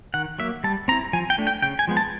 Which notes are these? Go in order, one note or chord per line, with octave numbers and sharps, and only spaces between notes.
D#3 F#5
F#3 A#3 E5
G3 A5
C4 E4 A#5
F3 G#5
G5
A3 D4
G5
C#3 G5
G#5
F3 G#3 B3
A5